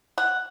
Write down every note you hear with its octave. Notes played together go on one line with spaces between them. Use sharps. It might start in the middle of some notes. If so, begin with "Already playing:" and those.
F#5